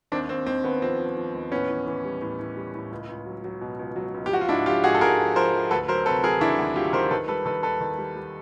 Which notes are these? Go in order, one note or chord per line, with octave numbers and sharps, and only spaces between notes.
D#2 C4 D4
D#2 C4
D#2 C4
D#2 B3
F3 C4
F3
F3
D#2
A2 B3 C#4
E3
E3
G3
A2
A2
G3
A2
C#2
C#2
F#3
F#3
B2
C#2
F#3
C#2
G4
F3 F#4
F4
G#2 D4 E4
F3 F4 G4
G#2 F#4 G#4
A4
G#2 G#4 A#4
F3
F3 A#4 C5
F3
D2 A4 B4
F#3 A#4 C5
C3 A4 B4
F#3 G#4 A#4
D#3 D4 E4
D2
F#3 F4 G4
D#3 A#4 C5
D#3 A4 B4
G3 A4 B4
D#3 A4 B4
D#2 A4 B4
D#3
G3
G3